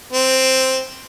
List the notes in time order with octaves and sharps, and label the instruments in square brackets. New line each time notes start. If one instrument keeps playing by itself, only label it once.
[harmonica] C4